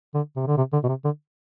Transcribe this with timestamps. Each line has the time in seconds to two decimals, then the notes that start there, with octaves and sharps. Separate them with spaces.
0.14 D3
0.36 C3
0.47 D3
0.57 C3
0.73 D3
0.84 B2
0.89 C3
1.05 D3